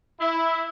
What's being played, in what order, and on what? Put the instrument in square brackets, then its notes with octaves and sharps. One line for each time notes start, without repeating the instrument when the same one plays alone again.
[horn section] E4